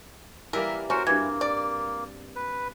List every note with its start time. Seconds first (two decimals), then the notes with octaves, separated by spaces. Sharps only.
0.53 E3 G3 A#3 A#4 E5
0.90 C#4 F#4 A#4 C5
1.07 G2 E3 A#3 C4 G#6
1.41 D5
2.36 B4